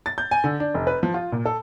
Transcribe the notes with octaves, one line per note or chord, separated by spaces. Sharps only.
A6
G6
G#5
D3
D4
F1
B4
F3
F4
A#2
A4